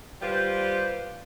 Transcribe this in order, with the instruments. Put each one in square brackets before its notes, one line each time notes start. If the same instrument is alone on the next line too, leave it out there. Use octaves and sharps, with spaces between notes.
[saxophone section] G3 F4 G4 B4 C5